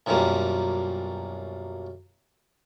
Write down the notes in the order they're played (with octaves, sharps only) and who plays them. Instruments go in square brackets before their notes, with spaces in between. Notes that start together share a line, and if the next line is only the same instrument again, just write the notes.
[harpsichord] B1 F#2 F3 G3 A#3